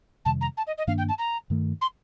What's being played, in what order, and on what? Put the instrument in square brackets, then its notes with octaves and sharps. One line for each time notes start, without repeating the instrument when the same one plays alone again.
[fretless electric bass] F2 C3 D#3 G3 [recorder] A5
[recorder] A#5
A5
D#5
D#5
[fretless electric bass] G2 D#3 A#3 D4 [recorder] F5
[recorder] G5
A5
A#5
[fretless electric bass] G2 D#3 A3
[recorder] C6